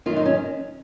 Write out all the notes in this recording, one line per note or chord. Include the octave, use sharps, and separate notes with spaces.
F#2 D#3 F4
D#4
C#4